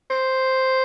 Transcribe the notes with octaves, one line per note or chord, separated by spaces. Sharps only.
C5